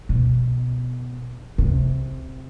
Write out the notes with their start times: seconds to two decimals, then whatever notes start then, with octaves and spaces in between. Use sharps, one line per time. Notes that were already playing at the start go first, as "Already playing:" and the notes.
0.09 B2
1.58 C3